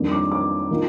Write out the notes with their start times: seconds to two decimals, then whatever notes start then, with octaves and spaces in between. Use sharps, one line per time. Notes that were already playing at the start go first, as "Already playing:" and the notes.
Already playing: F2 D#3 G3 A#3 D4
0.11 D6
0.32 D6
0.71 D#3 A#3 F4